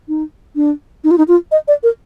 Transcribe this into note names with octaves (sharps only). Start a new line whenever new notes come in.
D#4
D4
D#4
F4
D#4
F4
D#5
D5
A#4